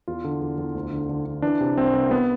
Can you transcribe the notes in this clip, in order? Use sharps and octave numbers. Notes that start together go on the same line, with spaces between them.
E2 F4
D3
E2
E2
D2
D3
D3
D3
E3 D4
C3
C2 C4
C2
B3